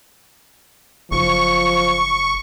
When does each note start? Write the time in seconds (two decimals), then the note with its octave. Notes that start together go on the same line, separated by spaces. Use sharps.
1.11 F#1 F3 C#6